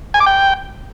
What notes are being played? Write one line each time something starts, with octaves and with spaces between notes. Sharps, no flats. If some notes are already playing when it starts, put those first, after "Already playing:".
G#5
D6
G5